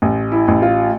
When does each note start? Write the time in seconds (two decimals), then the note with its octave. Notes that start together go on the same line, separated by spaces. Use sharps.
0.02 A1
0.32 E4
0.48 A1
0.62 F4